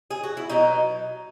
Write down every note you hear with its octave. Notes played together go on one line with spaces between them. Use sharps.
G#4
F#4
E4
B2 F#3 D#4